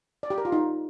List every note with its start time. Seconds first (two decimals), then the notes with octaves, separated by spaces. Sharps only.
0.23 D5
0.30 G4
0.38 A#4
0.45 F4
0.52 D#4